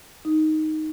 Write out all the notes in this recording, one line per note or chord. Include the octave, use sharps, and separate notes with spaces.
D#4